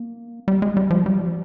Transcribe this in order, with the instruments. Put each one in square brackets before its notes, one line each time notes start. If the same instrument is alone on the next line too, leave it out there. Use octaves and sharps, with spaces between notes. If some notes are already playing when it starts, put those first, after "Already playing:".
Already playing: [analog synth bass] A#3
G3
G#3
G3
F3
G3